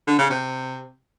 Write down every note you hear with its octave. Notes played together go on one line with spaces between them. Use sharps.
D3
C#3
C3